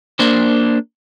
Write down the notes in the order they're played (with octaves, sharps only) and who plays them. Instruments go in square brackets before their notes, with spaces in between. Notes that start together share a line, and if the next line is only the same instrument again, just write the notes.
[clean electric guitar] A#3 D4 C5